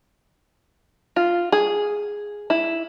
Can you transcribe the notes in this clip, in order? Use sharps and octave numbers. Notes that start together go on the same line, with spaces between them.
F4
G#4
E4